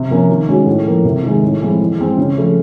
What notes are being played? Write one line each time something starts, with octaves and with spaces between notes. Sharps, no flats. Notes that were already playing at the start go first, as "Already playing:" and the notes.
Already playing: C3
F3 A#3 C#4
D#3
G#3 C#4 F#4
A2
F3 A#3
C3
D#3 G#3
A2
F3 G#3 C4 E4
E3
G#3 C4
C#3
F3 A3